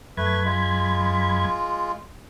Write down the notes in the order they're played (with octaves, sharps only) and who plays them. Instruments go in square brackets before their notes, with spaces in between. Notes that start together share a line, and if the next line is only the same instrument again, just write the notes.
[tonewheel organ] F#2 B5 G#6 [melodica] A3 B4
[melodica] G#3 F4